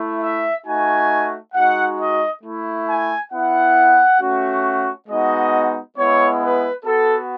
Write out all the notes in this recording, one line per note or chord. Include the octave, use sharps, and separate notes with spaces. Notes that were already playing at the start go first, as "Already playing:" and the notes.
Already playing: A3 E4
E5
A3 D#4 F#4 G#5
G#3 D#4 F#4 F#5
D#5
A3 E4
G#5
B3 E4 F#5
A3 C#4 F#4
G#3 B3 D#4 F#4 D#5
G#3 B3 E4 C#5
B4
B3 F#4 A4